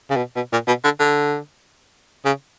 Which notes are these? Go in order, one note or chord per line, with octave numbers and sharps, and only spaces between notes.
C#3
B2
B2
A#2
B2
D3
D3
C#3